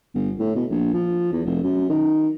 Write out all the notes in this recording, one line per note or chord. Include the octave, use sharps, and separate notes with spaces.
G1
A2
B2
A#1
F3
E2
F1
F#2
D#3